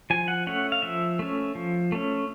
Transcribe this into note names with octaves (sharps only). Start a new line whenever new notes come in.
F3 G#5
F#5
A3 C#4 F#5
F5
F3 E5
A3 C#4
F3
A3 C#4